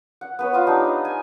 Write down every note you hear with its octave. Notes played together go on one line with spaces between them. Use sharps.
F#5
B3 B4 C#5
F4 D#5 B5
D4 D#4 G4
D#5
G#5